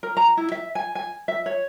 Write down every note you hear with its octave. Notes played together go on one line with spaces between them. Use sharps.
A#4
A#5
E4
E5
G#5
G#5
E5
C#5